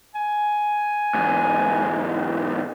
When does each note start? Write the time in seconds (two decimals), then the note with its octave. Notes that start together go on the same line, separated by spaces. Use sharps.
0.15 G#5
1.15 E2 G#2